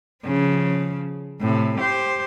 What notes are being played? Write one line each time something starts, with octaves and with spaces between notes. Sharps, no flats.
C#3 F3
A2 C3
G4 C5